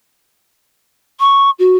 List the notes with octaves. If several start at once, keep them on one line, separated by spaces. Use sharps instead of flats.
C#6
F#4